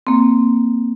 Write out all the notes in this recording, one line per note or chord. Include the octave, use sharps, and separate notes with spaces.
A#3 C4